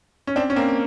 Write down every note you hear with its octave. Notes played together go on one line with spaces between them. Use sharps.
C#4
C4 D4
C#4
A#3 C4